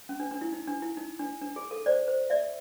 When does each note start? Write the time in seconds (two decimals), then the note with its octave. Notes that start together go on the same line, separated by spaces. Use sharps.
0.09 C#4
0.20 D4
0.31 D4
0.41 E4
0.53 D#4
0.67 D4
0.82 E4
0.97 D#4
1.19 D4
1.41 D4
1.56 G#4
1.71 A4
1.86 C5 D5
2.08 C5
2.30 D5 E5